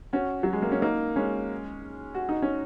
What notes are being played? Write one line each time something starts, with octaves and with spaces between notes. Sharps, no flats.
C#4 F#4
F#3
G#3
A#3
C#4
A#3 D#4
G#3 C#4
F#4
D#4
C#4